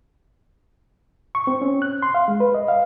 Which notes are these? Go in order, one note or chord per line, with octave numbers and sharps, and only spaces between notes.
C#6
C4
C#4
F#6
C6
F5
G#3
B4
D#5
F5